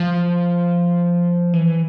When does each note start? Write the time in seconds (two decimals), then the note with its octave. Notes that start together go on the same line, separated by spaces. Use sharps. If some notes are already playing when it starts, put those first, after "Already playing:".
Already playing: F3
1.54 E3